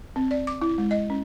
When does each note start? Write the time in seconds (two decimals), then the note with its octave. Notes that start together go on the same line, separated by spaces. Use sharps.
0.16 C4
0.31 D5
0.47 D6
0.62 E4
0.78 G#3
0.91 D#5
1.10 C#4